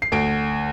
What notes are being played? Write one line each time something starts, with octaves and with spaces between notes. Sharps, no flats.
C7
D2 D7